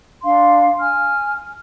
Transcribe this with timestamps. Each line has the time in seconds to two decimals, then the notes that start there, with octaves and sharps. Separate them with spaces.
0.24 D4 F5 C6
0.79 G#5 F6